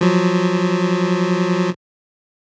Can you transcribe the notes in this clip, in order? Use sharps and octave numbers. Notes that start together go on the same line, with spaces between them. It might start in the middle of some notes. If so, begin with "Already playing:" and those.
F3 F#3